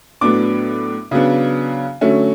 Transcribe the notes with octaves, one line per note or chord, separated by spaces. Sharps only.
A2 F#3 B3 D4 D6
C#3 F#3 B3 D4
D3 F#3 A3 C#4